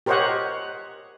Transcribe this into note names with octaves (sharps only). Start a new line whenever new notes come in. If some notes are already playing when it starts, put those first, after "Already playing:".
G4 A#4 C5 C#5 D#5 F#5